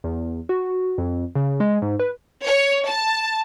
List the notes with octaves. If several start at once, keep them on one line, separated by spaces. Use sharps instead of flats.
E2
F#4
F2
C#3
G#3
G#2
B4
C#5
A5